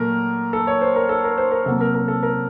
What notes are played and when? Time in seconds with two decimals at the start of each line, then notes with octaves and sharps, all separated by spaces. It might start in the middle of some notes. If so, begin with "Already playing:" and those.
Already playing: A#2 F#3 A3 A#4
0.53 A4
0.67 C#5
0.81 C5
0.96 A#4
1.09 A4
1.24 A#4
1.38 C5
1.51 A#4
1.66 C3 F#3 A#3 A4
1.81 A#4
1.94 A#4
2.08 A4
2.23 A#4